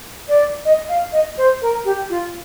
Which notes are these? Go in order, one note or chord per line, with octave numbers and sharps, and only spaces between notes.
D5
D#5
F5
D#5
C5
A#4
G4
F4